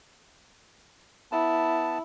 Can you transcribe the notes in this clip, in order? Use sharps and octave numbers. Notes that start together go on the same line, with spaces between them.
B3 E4 A5